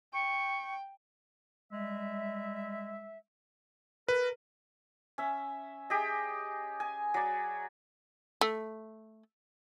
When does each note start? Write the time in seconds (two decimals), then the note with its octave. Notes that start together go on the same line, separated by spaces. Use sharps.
0.13 G5 C#6
1.72 G3 G#3 E5
4.08 A#4 B4
5.18 C#4 E5
5.90 G4 G#4 D#5
6.80 G#5
7.14 F#3 D5
8.41 A3